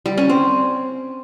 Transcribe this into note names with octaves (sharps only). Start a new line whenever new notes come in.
G3
C#4
C4